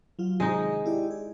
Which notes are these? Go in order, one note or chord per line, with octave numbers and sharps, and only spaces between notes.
F#3 F4
C3 D#3 G#3 D#4 G#4
E4 G4 D5
G#4